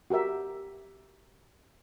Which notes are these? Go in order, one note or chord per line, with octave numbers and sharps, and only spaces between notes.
F#4 G4 A#4 E5